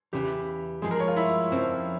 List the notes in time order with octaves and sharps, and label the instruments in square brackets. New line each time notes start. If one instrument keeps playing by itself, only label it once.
[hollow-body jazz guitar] E2 C#3 E3 [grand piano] G4
[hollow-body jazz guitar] G2 F3 G#3 [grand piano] G#4
[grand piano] A#4
C#5
F4
E4
[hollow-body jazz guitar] F2 C#3 F3 C4